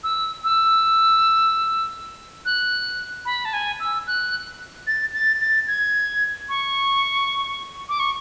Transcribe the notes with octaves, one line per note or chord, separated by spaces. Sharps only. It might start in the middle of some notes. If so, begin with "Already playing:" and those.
E6
E6
F#6
B5
A5
G#5
E6
F#6
A6
A6
A6
G#6
C#6
D6
C#6